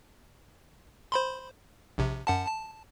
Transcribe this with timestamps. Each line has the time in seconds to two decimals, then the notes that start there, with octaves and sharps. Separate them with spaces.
1.12 C5 B5 C6
1.98 A#1 C3
2.27 F#2 F#5 A5
2.46 A5